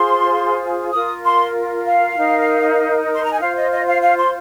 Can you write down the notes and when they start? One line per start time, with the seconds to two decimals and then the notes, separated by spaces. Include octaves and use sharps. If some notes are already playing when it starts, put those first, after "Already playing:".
Already playing: F4 G#4 C5 C6
0.92 F4 A#4 D#6
1.24 C6
1.85 F5
2.17 D#4 A#4
3.14 C6
3.23 A#5
3.32 G#5
3.41 F4 C5 F5
3.56 D#5
3.72 D#5
3.87 F5
4.03 F5
4.18 C6